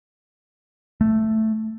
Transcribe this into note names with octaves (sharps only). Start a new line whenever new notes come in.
A3